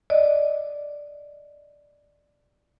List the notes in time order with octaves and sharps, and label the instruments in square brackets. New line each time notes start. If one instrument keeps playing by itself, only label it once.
[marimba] D5 D#5